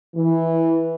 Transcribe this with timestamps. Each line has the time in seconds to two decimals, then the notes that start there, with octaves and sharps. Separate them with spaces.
0.15 E3